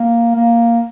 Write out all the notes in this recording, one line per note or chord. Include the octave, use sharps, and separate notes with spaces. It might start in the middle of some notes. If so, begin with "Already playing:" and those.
Already playing: A#3
A#3